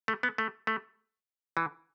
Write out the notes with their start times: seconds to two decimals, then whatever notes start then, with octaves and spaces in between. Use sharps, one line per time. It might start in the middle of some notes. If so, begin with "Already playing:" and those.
0.08 A3
0.23 B3
0.38 A3
0.67 A3
1.57 E3